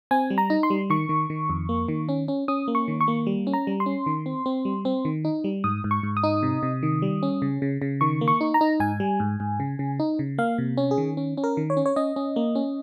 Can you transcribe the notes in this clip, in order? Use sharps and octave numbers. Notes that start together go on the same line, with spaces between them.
C4 G#5
G3
A#5
D#4
C6
G3
D#3 C#6
D#3
D#3
F2
A#3
D#3
C#4
C#4
C#4 D#6
A#3
C#6
D#3
C#6
A#3
G3
C#4
A#5
G3
C6
C#4
D#3
C4
C4
G3
C4
D#3
D#4
G3
G#2 D#6
G#2
C#6
G#2
D#6
D#4
C3
C3
D#3
G3
C#4
C#3
C#3
C#3
D#3 C#6
A#3
C#6
D#4
A#5
D#4
G#2 G#5
G3
G#2
G#2
C#3
C#3
D#4
C#3
A#3 F5
C3
C#4
G#4
D#3
C#4
C#4
A#4
D#3
C#5
C#4
C#5
C#4 D#5
C#4
A#3
C#4